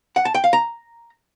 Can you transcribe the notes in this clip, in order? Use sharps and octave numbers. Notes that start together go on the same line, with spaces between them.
F#5
A5
G5
F5
A#5